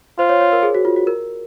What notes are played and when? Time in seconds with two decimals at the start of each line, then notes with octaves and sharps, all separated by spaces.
0.19 F4 C5
0.29 C#5
0.41 C#5
0.52 A#4
0.63 G#4
0.75 F#4
0.85 F4
0.96 F#4
1.07 A#4